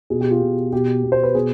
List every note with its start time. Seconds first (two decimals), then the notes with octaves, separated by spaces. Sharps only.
0.10 B2 G#4
0.21 G4
0.31 F4
0.42 B2
0.72 B2 G4
1.03 B2
1.12 C5
1.23 B4
1.35 B2 G#4